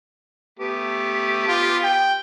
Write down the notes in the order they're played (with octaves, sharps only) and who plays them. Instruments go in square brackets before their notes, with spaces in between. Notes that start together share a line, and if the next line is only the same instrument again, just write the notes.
[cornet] A3 [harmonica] B3 G4
[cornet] F4
G5